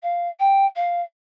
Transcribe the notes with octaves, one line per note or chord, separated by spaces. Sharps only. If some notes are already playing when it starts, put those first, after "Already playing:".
F5
G5
F5